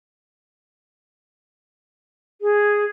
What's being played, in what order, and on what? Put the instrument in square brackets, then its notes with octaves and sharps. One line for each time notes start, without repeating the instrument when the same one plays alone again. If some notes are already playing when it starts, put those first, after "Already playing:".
[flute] G#4